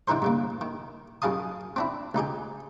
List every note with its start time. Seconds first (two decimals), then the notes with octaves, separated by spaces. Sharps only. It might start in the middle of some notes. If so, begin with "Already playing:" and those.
0.08 D3 E3 D#4 A#4 C5
0.22 G2 C#3 A#3
0.61 D#3
1.22 F#2 D#3 G#4 F5 A5 D#6
1.76 C4 D4 E4
2.15 C#2 D#4 G4 G#4